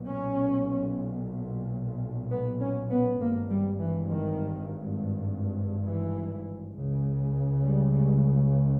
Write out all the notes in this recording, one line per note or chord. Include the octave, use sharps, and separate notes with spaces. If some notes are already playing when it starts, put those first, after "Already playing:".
Already playing: B1 A#2
C#4
B3
C#4
B3
G#1 G2 A#3
G3
E3
D#3
E3
C#2 C#3
G3
G3